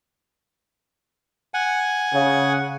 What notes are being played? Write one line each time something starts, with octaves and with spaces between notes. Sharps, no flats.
F#5 G#5
C#3